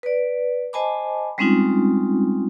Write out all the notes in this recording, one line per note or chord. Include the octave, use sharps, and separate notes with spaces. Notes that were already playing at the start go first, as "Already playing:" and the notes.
B4 D5
C5 D#5 G#5 A5 B5 D6
G3 G#3 C4 C#4 D#4 F4